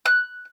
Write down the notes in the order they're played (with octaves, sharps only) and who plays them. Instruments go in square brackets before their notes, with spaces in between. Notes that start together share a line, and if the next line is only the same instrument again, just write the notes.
[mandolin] F#6